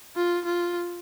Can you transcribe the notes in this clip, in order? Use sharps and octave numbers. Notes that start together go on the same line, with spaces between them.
F4
F4